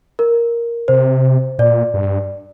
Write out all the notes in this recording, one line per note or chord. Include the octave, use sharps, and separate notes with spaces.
A#4
C3 C5
A#2 D5
G2